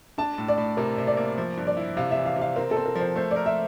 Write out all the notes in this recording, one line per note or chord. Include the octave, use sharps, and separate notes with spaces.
D4 A5
A2
D5
A2
C3 A#4
C3
D5
A#3
F3
G2
D5
E4
C3 F5
E5
E3
F5
C3
F5
C4 A#4
A4
C4
A#4
F3 C5
A3 C5
A#4 D5
E5